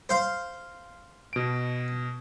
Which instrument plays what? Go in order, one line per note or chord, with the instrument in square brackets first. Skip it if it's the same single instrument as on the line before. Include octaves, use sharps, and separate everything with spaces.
[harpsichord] C5 F5
[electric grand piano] B2 D7